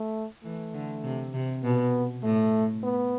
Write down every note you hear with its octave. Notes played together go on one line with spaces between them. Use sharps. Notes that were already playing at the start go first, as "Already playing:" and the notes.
Already playing: A3
E3 A3
D3
C3
C3
B2 B3
A2 A3
B3